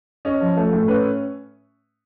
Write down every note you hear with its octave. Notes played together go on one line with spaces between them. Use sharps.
C#4 D#5
F3
A3
A2
C#4 B4